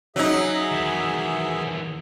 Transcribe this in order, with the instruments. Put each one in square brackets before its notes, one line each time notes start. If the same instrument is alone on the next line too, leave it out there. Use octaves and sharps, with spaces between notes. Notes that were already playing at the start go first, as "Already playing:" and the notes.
[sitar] F#3 D#4 [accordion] G#4 E5
[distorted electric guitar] D#2 E3